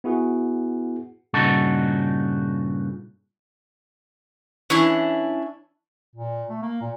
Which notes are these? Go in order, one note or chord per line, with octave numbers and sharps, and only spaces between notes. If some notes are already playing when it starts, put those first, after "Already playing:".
B3 E4 F#4 G#4 F#5
G2 A#2 C#3 D#4 F#4 A4
E3 C#4 D4 E4
A#2
A3
A#3
A#2